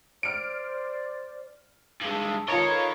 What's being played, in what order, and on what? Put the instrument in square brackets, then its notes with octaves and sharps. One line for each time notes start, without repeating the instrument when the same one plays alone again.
[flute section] C5 D5 [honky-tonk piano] F6 D7
[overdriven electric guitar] G2 G#3 [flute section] A5 E6
[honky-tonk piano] F4 A#5 [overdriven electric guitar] A#4 D#5 [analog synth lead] C#5
[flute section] A4 B4 B5